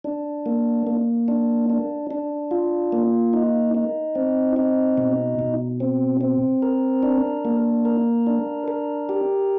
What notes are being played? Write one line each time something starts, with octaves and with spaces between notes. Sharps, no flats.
D4
A#3
A#3
D4
D4
D4
F4
A#3
D#4
D#4
C4
D#4
B2
B2
C4
C4
A#4
D4
A#3
A#4
D4
A#4
G4